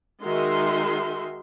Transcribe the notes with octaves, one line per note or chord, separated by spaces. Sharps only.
D#3 G#3 D#4 F#4 E5 C6